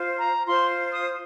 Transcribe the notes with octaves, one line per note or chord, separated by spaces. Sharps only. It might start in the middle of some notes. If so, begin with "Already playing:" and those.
Already playing: F4 C5
A#5
F4 C5 C6
D#6